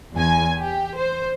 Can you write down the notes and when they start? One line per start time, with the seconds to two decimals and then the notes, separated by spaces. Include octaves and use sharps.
0.14 E2 G#5
0.58 G4
0.97 C5